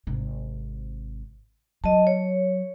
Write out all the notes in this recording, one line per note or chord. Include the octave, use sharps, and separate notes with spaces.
G#1 C3
F#3 D#5 A5
C#5